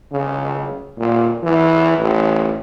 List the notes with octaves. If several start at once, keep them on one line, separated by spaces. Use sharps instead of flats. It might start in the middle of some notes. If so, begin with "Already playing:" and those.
C#3
A#2
E3
A1